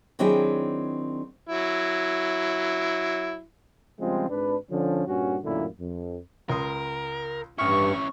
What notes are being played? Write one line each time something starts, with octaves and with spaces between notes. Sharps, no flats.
D#3 F#3 C4 D4 E4 G#4
F#3 E4
C#3 F3 G3 G#3 C4 F4
G#1 D4 B4
D3 F3 C#4
G2 A#2 C#4 F#4
A1 F#2 A#2 D3 A#3 E4
F2
C#2 A#4 C6 D#6
A1 G2 C#4 E4 C#6 F6